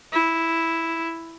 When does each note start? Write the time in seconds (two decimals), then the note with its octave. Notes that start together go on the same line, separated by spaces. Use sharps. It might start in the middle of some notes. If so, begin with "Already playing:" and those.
0.12 E4